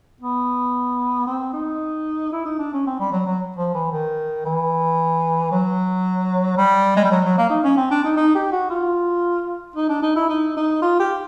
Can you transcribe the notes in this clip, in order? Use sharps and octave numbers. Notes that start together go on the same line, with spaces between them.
B3
C4
D#4
E4
D#4
D4
C#4
C4
G3
F#3
F#3
F3
E3
D#3
E3
F#3
G3
G#3
G3
F#3
F#3
A#3
D#4
C#4
C4
D4
D#4
D#4
G4
F#4
F4
D#4
D4
D#4
E4
D#4
D#4
F4
G4